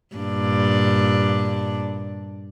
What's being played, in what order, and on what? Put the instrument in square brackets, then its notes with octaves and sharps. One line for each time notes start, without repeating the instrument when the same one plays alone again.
[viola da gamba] G2 A#2 D4